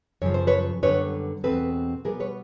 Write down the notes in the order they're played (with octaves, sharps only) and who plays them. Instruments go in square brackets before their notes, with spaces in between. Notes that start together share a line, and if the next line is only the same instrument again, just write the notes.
[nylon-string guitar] F#2 C#3 F3 C#5
C5
B4 C#5
F#2 D3 G3 B3 B4 C#5
E2 B2 G#3 C4 A4 B4
B2 G3 B3 G#4 A#4
B4 C#5